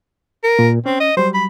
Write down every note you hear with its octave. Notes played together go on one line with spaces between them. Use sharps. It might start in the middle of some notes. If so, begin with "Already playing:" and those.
A#4
A#2
C4 C#4
D#5
F#3 G3 C5
B5